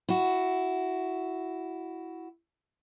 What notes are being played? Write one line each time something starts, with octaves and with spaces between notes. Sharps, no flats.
E4 F#4